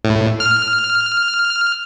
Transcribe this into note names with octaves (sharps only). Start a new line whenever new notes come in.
A2
F6